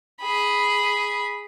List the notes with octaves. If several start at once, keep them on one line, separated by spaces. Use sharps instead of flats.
G#4 B5